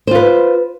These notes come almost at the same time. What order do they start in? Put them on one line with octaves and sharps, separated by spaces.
C5 F4 B4